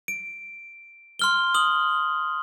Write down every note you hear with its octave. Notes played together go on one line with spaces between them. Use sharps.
D7
C6 F6 G7
D#6 F#7